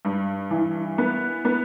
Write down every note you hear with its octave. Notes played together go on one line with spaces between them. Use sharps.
G2
E3
B3
B3